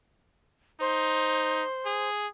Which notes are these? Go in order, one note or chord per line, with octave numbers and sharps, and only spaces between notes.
D#4 C5
G#4